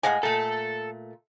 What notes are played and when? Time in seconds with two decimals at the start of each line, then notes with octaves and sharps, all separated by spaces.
0.03 A2 G#3 F5 F#5 G#5
0.23 A#2 A3 A4